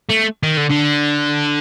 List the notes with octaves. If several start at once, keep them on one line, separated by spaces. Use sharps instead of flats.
A3
D#3
D3
D3